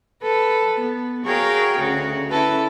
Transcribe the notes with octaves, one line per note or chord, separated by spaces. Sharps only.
A4 B4
B3
F#4 G#4 A#4 C#5 F5 G5
D2 C#3 C#4 F#4
C#4 E4 A4 B4